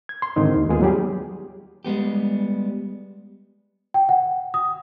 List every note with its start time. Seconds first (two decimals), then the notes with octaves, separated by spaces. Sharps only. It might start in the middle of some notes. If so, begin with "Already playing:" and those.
0.09 G#6
0.22 C6
0.36 G#2 D3 D#3 C4 D#4
0.56 D#2
0.69 G#3 A#3 B3 F4 G#4
0.82 F#3 G3 G4 G#4
1.85 G3 G#3 B3 G4
3.94 G5
4.09 F#5
4.54 D#6